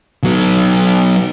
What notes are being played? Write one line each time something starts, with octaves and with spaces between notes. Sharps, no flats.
F#3 B3